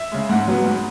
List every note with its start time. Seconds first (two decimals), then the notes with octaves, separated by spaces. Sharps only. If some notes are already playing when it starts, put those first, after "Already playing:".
Already playing: E5
0.12 C#3 G#3
0.29 G#2 F#5
0.48 F#3 B3
0.65 G#2